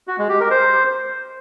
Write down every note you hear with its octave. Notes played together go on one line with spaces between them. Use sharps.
F#4
G#3
G4
A#4
C5